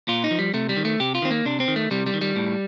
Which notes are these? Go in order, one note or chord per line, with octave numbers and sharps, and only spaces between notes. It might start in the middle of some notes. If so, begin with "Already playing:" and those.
A#2 F4
D#4
F3
G3
C3 A3
G3
D#3
A3
C3 G4
F4
D#3 C4
A#3
C3 D4
C4
D#3
A3
C3 G3
G3
D#3
G3
A2